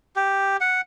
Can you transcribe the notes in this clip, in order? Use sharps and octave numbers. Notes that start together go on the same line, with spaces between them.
G4
F#5